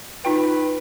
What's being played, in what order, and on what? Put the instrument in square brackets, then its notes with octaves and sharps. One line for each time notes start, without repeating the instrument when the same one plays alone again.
[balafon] D#4 F4 G5 [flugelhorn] B4